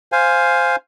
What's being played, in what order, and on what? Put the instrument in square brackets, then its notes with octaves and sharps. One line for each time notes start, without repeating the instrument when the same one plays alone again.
[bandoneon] C5 F5 G#5